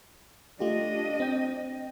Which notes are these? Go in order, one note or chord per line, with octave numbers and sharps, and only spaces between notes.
A3 D4 F4 G4 D#5
C4 G5